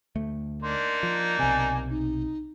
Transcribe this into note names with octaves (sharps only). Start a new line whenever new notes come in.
D2 A3
A#3 D4 D#4 C6
F3
B1 C3 G#5
D#4